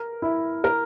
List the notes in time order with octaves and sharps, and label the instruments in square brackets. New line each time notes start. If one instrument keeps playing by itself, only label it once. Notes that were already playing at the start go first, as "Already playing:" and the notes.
Already playing: [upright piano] A#4
E4
A#4